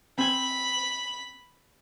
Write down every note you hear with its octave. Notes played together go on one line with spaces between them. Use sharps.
C4 G#5 B5